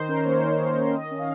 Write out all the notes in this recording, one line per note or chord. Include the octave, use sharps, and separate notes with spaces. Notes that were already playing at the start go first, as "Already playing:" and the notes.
Already playing: D#3 D#4 C5
C#4 A#4
A#3 C#5
D#3
D#3
C#4
D#3 D#5
C#4
F5